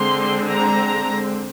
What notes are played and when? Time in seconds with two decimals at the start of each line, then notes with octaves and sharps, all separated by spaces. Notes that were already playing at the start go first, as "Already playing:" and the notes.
Already playing: D3 G#3 C4 C6
0.52 A#5